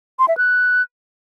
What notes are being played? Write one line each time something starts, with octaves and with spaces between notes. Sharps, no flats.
C6
E5
F#6